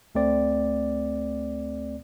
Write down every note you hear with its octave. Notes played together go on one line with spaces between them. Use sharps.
D2 A3 C4 D5